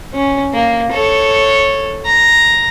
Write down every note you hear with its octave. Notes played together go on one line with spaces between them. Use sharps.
C#4
A#3
A4 C#5
A#5